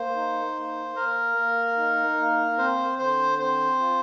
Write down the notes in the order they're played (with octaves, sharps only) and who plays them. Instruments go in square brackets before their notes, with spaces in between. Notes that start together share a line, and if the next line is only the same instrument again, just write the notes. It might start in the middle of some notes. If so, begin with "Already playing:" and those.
Already playing: [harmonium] A#3 [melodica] C5
[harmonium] D#4
A#3
[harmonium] A#3 [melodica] A#4
[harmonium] A#3
D#4
A#3
[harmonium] C4 [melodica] C5
[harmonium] D3 [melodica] C5
[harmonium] C4 [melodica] C5
[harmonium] F4